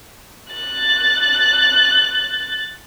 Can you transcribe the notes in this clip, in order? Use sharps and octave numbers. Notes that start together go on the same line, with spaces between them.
F#6 A6